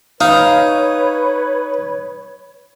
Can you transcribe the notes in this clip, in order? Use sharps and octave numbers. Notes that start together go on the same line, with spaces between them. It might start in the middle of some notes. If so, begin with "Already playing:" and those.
D#4 B4 C#5 F5